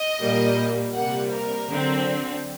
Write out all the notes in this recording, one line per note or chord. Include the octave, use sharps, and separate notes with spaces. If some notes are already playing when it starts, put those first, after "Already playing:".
Already playing: D#5
A#2 G3 A#3
C3 G3 A#3 F#5
A#4
D3 F#3 C4